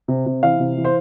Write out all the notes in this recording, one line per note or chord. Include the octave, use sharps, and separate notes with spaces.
C3
C3
E3 F5
C3
E3
C5